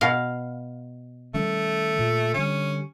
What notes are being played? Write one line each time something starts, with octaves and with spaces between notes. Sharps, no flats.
B2 F5
D#3 G3 A3 C#4
A#2
D3 G3 C#4